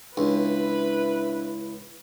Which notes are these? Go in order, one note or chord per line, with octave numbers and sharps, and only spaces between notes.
C#2 D4 E4 B4